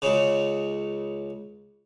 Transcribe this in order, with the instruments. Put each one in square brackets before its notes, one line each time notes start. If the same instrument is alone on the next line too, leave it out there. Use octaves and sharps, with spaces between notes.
[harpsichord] C#2 C#3